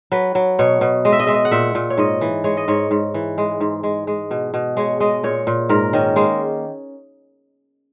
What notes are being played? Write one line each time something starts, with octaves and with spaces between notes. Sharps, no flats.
F#3 B4
F#3
B2 C#5
B2
G#3 D#5
E5
D#5
G#3 E5
D#5
F#5
A#2 E5
A#2
C#5
G#2 D#5
E3
G#3 C#5
D#5
G#2 C#5
G#2
E3
G#3
G#2
G#3
G#3
B2
B2
G#3 C#5
G#3 D#5
A#2 C#5
A#2
G#2 A#4
D#3 C#4
G#3 A#3